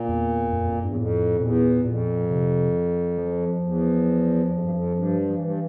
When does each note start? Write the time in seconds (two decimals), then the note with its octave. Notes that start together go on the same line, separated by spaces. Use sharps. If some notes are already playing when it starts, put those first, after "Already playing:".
Already playing: A#2
0.09 E2
0.53 F2
0.72 F2
0.84 E2 G2
0.97 F2 A2
1.40 E2 A#2
1.85 F2 A#2
2.30 C3
3.18 F3
3.58 F2
3.62 E2
4.51 F2
4.61 G2
4.71 F2
4.95 G2
5.30 F3
5.39 G2 E3